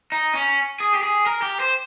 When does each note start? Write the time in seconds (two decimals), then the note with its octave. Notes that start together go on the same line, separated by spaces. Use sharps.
0.12 D#4
0.35 C#4
0.80 G#4
0.95 G4
1.03 G#4
1.26 A#4
1.42 G4
1.60 C5